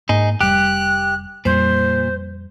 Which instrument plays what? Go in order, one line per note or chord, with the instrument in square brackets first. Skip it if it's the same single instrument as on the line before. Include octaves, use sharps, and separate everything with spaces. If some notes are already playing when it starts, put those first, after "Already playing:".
[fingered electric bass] G#2 A#3 [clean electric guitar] D#4 G#4
[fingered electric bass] F1 G3 [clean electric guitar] G4 [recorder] F#6
[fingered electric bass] F2 G3 [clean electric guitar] A#2 [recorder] C5